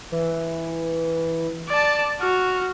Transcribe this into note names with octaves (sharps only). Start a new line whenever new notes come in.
E3
D5 A5
F#4 F6